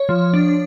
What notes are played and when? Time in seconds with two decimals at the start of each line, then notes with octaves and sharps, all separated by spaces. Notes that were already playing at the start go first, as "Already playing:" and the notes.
Already playing: C#5
0.09 F3
0.34 D4